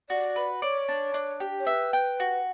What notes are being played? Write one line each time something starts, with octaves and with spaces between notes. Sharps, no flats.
F#4 D5
B4
C#5 D5
D4
D4
G4
C#5
B4 E5
G5
F#4